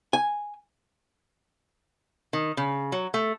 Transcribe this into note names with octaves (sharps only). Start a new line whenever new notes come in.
G#5
D#3
C#3
F#3
A3